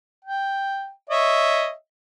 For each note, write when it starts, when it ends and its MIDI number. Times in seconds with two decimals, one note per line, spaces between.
0.25 0.90 79
1.10 1.71 73
1.10 1.71 75
1.10 1.71 76